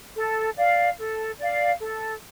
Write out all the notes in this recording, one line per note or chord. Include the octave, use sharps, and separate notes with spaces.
A4
D5 F5
A4
D5 F5
A4